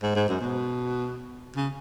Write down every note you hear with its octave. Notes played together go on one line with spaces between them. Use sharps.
G#2
G#2
F#2
B2
C#3